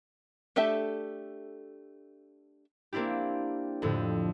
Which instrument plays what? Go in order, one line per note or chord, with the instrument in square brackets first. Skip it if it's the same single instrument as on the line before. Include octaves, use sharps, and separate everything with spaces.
[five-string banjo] A3 D4 G4 A4 E5
[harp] A#3 C4 D4 E4 G4
F2 A2 D3